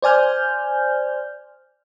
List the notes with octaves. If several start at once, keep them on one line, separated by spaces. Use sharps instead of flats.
C5 D5 G#5 F6 G6